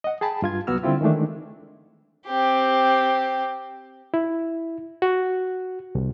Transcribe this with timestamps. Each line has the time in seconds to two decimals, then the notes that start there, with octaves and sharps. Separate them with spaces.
0.04 D#5 F#5
0.21 G#4 G5 A5 B5
0.42 G2 F4 G#6
0.67 C2 F#3 B3 F#4 E6 F6
0.83 D3 G3 C4 E4 F4 G4
1.01 D#3 E3 G#3 A3 D4
2.27 C4 G4
4.14 E4
5.02 F#4
5.95 C2